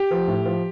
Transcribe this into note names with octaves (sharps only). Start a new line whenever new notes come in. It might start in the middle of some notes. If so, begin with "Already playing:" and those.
Already playing: G4
F3
A2
F3